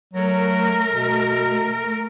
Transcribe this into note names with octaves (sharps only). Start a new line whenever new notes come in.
F#3 A3 A#4
B2